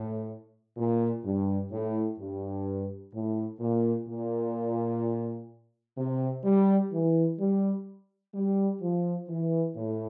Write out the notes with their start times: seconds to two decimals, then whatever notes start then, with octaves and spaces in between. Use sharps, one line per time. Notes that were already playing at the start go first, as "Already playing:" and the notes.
Already playing: A2
0.77 A#2
1.24 G2
1.72 A2
2.18 G2
3.13 A2
3.60 A#2
4.08 A#2
5.97 C3
6.44 G3
6.92 E3
7.39 G3
8.34 G3
8.81 F3
9.29 E3
9.76 A2